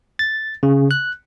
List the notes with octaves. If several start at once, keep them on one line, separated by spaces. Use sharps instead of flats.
A6
C#3
F#6